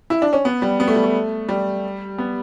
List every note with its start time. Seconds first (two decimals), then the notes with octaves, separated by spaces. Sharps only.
0.10 E4
0.22 D4
0.33 C#4
0.45 B3
0.62 G3
0.80 B3
0.88 A3
0.96 G3
1.03 A3
1.49 G3
2.18 B3